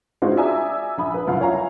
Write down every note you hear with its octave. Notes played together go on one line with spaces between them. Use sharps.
G#3 C4 D4 D#4 F4 F#4
D5 E5 G#5 A#5 D#6 E6
A#1 B5 D#6
B4
F#1 C2 F4 F5
C#5 F5 G#5 A#5